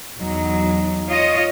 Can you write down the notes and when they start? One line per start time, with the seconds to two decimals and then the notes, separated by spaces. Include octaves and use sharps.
0.18 E2 F#3 D#4
1.09 F4 C#5 D#5